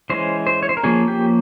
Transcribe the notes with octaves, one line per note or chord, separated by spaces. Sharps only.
E3 G#3 C#4 C5
C5
C#5
C5
A#4
F3 A#3 C#4 G#4
G4